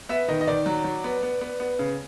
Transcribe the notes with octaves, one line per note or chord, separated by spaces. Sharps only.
B3 E5
D#3 D#5
D#5
D#3 D5
F#3
F#3
B3
B3
B3
B3
C#3